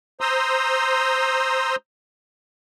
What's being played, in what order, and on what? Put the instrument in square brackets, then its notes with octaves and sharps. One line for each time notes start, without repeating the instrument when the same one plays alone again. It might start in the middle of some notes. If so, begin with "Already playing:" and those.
[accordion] C5 A#5 C6 D#6 E6